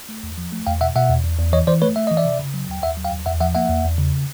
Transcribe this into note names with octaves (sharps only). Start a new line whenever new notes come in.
A3
E2
F3
A3
E2 F5 G5
B2 E5 F#5
B2 E5 F#5
E2
E2
E2
E3 C#5 D#5
E3 C5 D5
A3 B4 C#5
A3 E5
E3 D#5
D5 E5
C3
C#3
F#3
D#2 G5
D#2 E5 F#5
F#3
F5 G5
D#2
E2 E5 F#5
F3 E5 F#5
A#3 E5 F#5
E2
E2
C#3